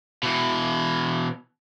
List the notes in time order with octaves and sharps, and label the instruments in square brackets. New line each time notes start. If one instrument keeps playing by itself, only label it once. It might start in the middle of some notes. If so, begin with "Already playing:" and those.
[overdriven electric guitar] B2 E3